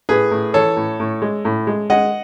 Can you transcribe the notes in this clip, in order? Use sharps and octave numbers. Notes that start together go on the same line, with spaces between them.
A2 G#4 B4
A2
E3 A4 C#5
A2
A2
G#3
A2
G#3
G#3 D#5 F#5